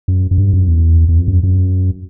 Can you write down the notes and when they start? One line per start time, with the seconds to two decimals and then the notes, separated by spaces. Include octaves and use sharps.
0.08 F#2
0.31 F#2
0.38 G2
0.53 F#2
0.68 E2
1.08 E2
1.18 F2
1.28 F#2
1.43 F#2